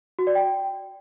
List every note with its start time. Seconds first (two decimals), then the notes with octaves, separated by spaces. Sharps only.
0.19 F#4
0.27 D5
0.35 G5